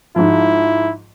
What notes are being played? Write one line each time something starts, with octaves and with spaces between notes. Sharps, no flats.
G#2 F3 E4